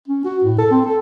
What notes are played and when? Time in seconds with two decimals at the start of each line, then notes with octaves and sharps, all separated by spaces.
0.08 C#4
0.25 F#4
0.44 A2
0.59 A4
0.71 C4
0.85 A4